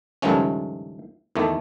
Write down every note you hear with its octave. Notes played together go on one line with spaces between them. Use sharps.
C#2 G2 D#3 F3 A3 C#4
E2 D#3 A3